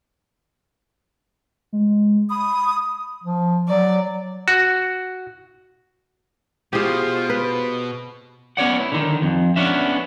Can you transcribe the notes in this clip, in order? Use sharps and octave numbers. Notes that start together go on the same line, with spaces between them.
G#3
B5 D#6
F3
F#3 D5
F#4
B2 F4 G4 G#4 C5
B4
B3 C#4 C#5 D5 F#5
E4
D3 D#3
F2
B3 C#4 D4 E5